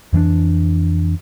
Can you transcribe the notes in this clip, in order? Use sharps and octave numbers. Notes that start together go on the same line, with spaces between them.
F2 E3 C4 D4